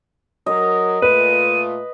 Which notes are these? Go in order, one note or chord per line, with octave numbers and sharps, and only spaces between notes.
F#3 A#4 D#5
A#2 A3 F4 B4 D#7